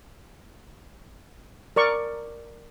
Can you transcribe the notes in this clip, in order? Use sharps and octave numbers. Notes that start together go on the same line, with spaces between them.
A#4 D5 C#6